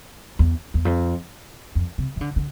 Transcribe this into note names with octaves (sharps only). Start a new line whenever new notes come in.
E2
E2
F2
F2
C3
E3
D3
D3